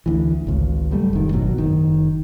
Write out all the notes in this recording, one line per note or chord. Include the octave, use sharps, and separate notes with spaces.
D2 E3
G#1 C#2
F#3 G3 A3
F1 D#3
G#1 B2 F#3
F#1 D#3